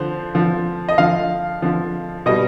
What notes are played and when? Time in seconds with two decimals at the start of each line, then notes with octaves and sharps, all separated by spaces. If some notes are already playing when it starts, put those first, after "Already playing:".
Already playing: D3 F3 C5
0.35 D3 F3
0.89 D#5
0.98 D3 F3 F5
1.62 D3 F3
2.26 B2 G3 D#5